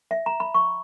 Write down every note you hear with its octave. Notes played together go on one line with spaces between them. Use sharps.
E5
A#5
B5
C#6